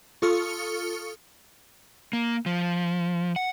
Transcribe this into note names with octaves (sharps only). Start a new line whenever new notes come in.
F4 A4 C#6 D#6 F6 C#7
A#3
F3
F#5